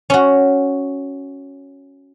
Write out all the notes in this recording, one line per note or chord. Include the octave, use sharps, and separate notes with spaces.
C#4 F#4